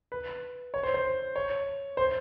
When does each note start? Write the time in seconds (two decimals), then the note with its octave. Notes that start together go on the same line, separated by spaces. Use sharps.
0.12 B4
0.74 C#5
0.83 C5
0.94 C5
1.36 C#5
1.97 C5